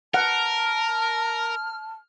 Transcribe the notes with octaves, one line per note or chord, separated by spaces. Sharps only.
A#4 F#5 A5 F6